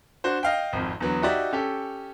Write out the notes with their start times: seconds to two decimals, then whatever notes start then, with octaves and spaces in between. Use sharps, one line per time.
0.24 D4 F#4 C5
0.43 D#5 F5 G5
0.73 G#1 F2
1.00 E2 D3 F#3 B3
1.22 D#4 F#4 G4 D5 E5
1.53 C#4 G4 A4